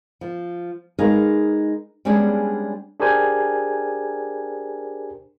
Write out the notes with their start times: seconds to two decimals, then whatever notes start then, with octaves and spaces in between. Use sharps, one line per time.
0.21 F3
0.99 G#3 D#4 G#4 A#4 B4 F5
2.05 G3 G#3 B3 C#4 D4 G#4
3.00 D4 G4 G#4 A#4 C5 G#5